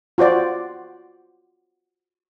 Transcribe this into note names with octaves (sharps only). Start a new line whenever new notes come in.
F4 F#4 C5 D5